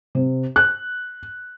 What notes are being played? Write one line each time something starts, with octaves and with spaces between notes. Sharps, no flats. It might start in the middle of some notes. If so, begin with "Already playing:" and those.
C3
F#6